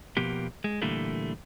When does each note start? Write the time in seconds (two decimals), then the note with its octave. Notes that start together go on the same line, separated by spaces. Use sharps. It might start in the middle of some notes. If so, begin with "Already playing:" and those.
0.17 B2 F3 A#3 B3 G4
0.64 G#3
0.81 A#2 D3 E3 G3 A3 A#3